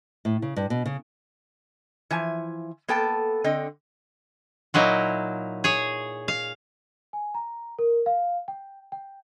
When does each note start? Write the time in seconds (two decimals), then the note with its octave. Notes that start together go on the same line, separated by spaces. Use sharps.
0.25 A2
0.42 C#3
0.56 G2
0.70 B2
0.86 C#3
2.11 E3 F3 G#5
2.88 A#3 B3 A4 G5 A5
3.44 D3 C4 D#5
4.74 A#2 F#3 D#4 E4
5.64 G#4 C#5
6.28 F5
7.13 G#5
7.34 A#5
7.79 A#4
8.06 F5
8.48 G5
8.92 G5